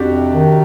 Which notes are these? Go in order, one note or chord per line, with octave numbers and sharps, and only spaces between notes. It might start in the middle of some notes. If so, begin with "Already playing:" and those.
Already playing: F2 D4 F#4 G4
C3
D#3